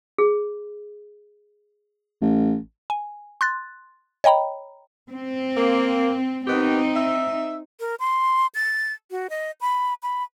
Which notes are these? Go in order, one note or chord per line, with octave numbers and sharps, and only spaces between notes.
G#4
A1
G#5
C6 F#6 A6
C#5 D#5 G5 A#5 B5
C4
A#3
D#3 B3 C4 D#4 G4
E5
A#4
C6
A6
F#4
D#5
B5
B5